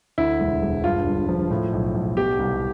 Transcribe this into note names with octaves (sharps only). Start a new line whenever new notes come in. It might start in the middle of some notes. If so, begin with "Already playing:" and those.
D2 E4
E1
E1
G2 F4
G1
F3
A2
B1
B1
B2 G4
C2